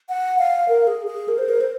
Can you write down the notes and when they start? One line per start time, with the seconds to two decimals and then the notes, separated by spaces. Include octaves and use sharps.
0.09 F#5
0.38 F5
0.68 A#4
0.87 G#4
1.07 G#4
1.28 A#4
1.38 C5
1.49 A#4
1.61 C5